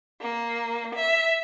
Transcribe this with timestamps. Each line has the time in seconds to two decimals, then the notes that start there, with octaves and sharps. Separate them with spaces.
0.22 A#3
0.95 E5